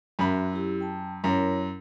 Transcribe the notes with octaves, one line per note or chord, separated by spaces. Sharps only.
F#2 F#4 A#4 E5 B5
E4 G4
G5 A5
F#2 E4 A#4 C#5